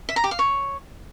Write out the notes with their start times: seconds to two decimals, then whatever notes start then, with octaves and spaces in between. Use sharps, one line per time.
0.09 E5
0.16 A#5
0.24 G4
0.31 F5
0.39 C#5